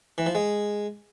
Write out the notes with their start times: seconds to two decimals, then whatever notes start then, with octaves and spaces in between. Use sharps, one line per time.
0.18 E3
0.26 F3
0.35 G#3